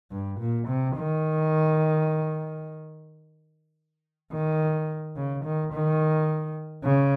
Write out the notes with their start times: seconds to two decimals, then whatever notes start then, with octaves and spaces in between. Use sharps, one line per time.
0.12 G2
0.40 A#2
0.68 C3
0.96 D#3
4.32 D#3
5.17 C#3
5.45 D#3
5.73 D#3
6.84 C#3